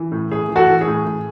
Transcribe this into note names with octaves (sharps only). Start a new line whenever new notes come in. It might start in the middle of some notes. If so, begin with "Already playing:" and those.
Already playing: E3
A2
A2 G#4
E3
F#4 A4
E3
G#4
A2
A2